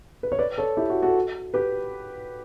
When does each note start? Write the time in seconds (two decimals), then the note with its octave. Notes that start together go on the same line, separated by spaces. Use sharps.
0.23 B4
0.32 C#5
0.39 B4 D5
0.58 A4 C#5
0.77 E4 G4
0.90 F#4
1.03 F#4 A4
1.54 G4 B4